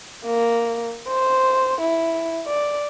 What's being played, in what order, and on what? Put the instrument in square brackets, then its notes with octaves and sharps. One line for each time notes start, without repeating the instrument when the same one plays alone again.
[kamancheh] A#3
C5
E4
D5